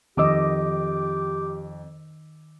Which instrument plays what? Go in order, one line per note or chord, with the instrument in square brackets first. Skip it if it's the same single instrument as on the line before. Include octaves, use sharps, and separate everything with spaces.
[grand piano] F2 D6 E6 [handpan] D#3 D#5 [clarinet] G4